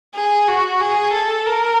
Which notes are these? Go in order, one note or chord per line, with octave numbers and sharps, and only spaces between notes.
G#4
F#4
G#4
A4
A#4